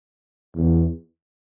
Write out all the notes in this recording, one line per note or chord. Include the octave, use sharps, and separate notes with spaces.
E2